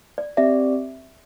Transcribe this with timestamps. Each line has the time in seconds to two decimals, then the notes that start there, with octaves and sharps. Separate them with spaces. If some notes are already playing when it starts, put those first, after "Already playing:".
0.18 D5
0.37 C4 G4 D5 E5